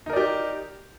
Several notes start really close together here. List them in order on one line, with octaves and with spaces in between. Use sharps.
D#4 A#4 D5 G4